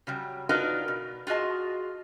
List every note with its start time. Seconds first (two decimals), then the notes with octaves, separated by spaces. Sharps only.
0.07 C#3 F#3 G3
0.49 D4 D#4 F4 F#4 A#4 B4
0.88 B2
1.27 F4 F#4 G#4 D#5 A5